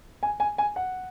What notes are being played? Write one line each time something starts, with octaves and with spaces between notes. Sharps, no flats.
G#5
G#5
G#5
F#5